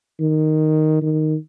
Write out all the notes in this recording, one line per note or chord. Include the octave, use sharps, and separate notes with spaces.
D#3
D#3